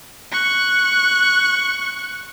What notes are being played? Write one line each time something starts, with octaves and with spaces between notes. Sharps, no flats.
C#6 F#6